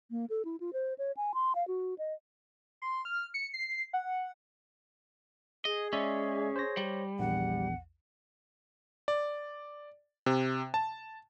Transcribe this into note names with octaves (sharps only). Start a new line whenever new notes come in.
A#3
A4
E4
F4
C5
C#5
G#5
C6
F5
F#4
D#5
C6
F6
C#7
C7
F#5
G#4 D#5
G#3 C#4 D5 E5
C5 C#5 A#6
G3
A#1 E2 F#5
D5
C3
A5